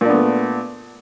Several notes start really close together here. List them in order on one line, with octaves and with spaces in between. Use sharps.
A#2 D4 B3 A3